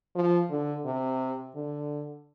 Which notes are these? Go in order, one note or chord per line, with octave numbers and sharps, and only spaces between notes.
F3
D3
C3
D3